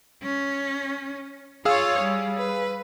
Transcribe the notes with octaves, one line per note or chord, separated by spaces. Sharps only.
C#4
F4 G#4 C#5 F5 E6
G3
B4